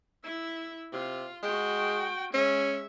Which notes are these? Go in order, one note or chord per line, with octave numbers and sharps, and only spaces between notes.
E4 E5
C3 F4
G#3 F#4 G5
G#3 C#4 E5